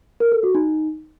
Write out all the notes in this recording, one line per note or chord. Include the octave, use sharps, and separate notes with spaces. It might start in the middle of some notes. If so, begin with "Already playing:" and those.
A#4
A4
F#4
D#4